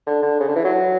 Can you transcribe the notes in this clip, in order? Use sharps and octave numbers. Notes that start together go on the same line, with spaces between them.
D3
D3
C#3
D3
E3
F#3